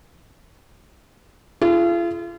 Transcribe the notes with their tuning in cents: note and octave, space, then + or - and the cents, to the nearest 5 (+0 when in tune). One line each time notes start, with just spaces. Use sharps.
F4 -40 G#4 +35